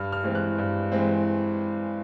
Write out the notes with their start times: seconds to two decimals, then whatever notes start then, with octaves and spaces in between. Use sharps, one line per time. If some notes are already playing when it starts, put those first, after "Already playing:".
Already playing: G2 F6
0.12 F6
0.24 E3 G#3 C4
0.35 F#6
0.58 G2
0.92 E3 G#3 C4